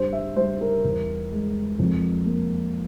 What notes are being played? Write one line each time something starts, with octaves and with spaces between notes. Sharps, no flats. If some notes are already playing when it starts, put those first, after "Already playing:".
Already playing: G2 G3 C5
E5
G3 C5
A#4
E2
G#3
F2
A#3